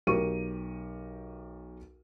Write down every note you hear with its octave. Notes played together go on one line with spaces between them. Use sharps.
B1 G4 A#4 C#6 D#7